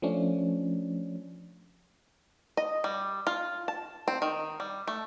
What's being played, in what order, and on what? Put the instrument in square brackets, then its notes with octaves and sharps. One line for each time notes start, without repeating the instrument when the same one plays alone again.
[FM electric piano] F3 A3 C#4 D4
[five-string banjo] D#5
G3
F4
A5
C4
D#3
G3
A3